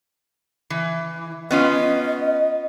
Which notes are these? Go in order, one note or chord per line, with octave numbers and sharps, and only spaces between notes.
E3
B3 C#4 F4 D#5